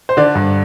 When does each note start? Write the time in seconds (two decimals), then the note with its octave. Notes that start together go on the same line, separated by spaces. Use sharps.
0.09 C5
0.17 D3 D5
0.35 G2